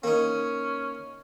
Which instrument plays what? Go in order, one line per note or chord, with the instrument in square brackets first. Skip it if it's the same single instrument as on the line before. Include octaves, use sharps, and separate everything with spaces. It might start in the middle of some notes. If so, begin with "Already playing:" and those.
[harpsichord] A#3 D#4 [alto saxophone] C#4